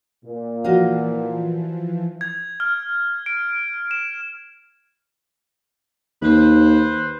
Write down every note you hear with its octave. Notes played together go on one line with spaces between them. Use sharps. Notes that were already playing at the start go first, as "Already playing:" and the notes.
A#2
E3 F3 F#4 D#5 F5
G#6
F6
D7
E7
D#2 B4 C5